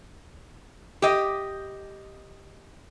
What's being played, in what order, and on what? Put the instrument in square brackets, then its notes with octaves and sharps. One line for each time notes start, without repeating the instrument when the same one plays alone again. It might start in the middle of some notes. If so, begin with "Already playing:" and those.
[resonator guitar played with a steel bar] G4 D#5